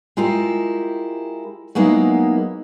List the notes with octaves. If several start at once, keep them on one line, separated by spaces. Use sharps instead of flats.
G#3 E4 F4 G4 A#4
F#3 G#3 A#3 B3 D#4 E4